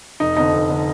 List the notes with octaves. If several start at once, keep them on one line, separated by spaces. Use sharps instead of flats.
F1 D#4
F2 D3 D#4
F1
D3